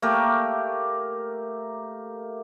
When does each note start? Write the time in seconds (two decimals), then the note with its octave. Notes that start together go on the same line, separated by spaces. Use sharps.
0.02 A3 A#3 G4 A#4